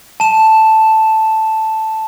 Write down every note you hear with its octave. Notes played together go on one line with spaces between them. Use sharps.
A5 E7